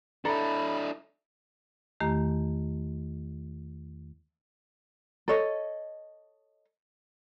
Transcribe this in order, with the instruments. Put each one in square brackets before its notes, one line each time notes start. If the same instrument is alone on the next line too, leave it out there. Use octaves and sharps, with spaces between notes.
[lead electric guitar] D4 E4 [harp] A4 A#5 D7 [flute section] B5
[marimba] E2 D#3 A3 G4 A#5
[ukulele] A4 C#5 D#5